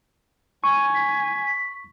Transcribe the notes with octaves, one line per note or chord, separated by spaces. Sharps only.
G#5 C#6 D#7
B6